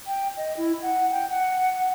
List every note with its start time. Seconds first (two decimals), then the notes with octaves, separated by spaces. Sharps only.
0.07 G5
0.37 D#5
0.57 E4
0.82 F#5
1.11 G5
1.30 F#5